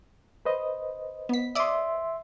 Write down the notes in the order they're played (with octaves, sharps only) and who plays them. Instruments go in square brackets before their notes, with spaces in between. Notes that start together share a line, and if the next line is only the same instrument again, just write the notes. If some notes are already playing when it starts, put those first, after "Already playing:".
[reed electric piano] B4 C5 D#5
[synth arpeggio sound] B3 B6
[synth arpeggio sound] D5 D6 D#6 [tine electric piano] E5 C6